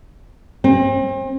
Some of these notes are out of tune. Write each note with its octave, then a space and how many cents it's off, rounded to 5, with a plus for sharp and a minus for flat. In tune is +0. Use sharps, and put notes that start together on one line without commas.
C4 +40